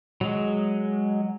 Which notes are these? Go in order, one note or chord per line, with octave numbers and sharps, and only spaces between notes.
F#3 G#3